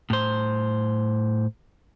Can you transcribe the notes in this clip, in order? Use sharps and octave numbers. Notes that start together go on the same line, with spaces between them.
A2 C5